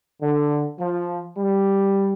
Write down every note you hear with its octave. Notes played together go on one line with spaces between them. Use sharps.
D3
F3
G3